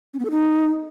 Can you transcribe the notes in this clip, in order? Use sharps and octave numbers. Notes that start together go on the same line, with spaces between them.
C#4
B3
A4
D#4